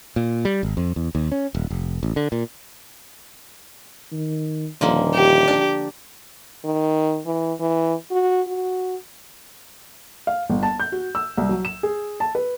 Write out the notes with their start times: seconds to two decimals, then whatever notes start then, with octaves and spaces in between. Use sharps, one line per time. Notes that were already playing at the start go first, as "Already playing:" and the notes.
0.16 A#2
0.45 G3
0.63 G#1
0.77 F2
0.96 E2
1.15 D#2
1.32 C#4
1.55 D#1
1.70 F1
2.03 A1
2.16 D3
2.32 A#2
4.12 D#3
4.81 D#1 D3 F3 A#3
5.15 G4
5.48 D4
6.65 D#3
7.26 E3
7.60 E3
8.11 F#4
8.47 F#4
10.27 F5
10.50 G1
10.63 A5
10.80 G6
10.92 F#4
11.15 E6
11.37 C2
11.49 F#3
11.65 E7
11.83 G#4
12.20 A5
12.35 B4